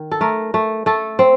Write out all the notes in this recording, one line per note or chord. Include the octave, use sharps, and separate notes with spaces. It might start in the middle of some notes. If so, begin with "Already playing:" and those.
Already playing: D#3
A4
A3 A#4
A3
A3 A4
C4